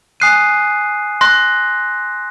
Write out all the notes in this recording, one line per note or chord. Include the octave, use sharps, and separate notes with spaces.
G#5 D#6 F#6 C7 D#7
C6 F#6 A#6